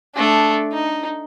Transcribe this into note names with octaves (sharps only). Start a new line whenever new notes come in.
A3 D4
D#4